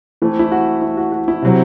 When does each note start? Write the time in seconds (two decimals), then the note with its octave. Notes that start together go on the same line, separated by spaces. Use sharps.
0.22 E3 A3 C4 E4
0.39 E4
0.52 F#4
0.82 E4
0.97 F#4
1.12 F#4
1.28 E4
1.42 C3 F#3 C4